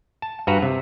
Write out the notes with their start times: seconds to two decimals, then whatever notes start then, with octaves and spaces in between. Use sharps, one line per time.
0.22 A5
0.47 G2 F#4 B4 A#5
0.62 C3